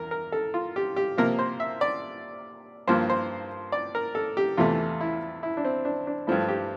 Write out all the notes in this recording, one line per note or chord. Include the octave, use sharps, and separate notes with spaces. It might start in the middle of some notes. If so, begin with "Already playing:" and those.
Already playing: E2 A#4
A#4
A4
F4
G4
G4
C3 F3 A#3 A#4
C5
E5
D5
G2 F3 A#3 C5
C5
D5
A#4
A4
G4
E2 C3 E3 A3 F4
E4
E4
D4
C4
D4
D4
G2 F3 A3 E4
G4